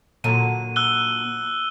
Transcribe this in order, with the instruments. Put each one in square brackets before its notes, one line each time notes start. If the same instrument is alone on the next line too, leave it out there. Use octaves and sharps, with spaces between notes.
[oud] A#2 D3 F#3 [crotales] D#7
[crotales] E6 F#6 G7